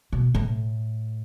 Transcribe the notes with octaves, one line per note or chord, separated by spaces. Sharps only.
B2
A2